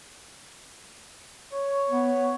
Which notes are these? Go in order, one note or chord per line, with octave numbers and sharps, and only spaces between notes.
C#5
B3